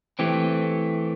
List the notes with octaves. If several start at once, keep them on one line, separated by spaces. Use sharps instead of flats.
E3 A3 C4 G4